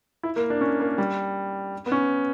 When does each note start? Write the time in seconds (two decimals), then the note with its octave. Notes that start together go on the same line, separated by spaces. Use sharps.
0.23 E4
0.36 A#3
0.50 D4
0.61 C#4
0.80 A#3
0.98 G3
1.86 B3
1.92 C#4